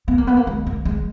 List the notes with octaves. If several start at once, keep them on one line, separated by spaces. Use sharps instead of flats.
B3
A#3
B3
A#3
G#3
A#3
G#3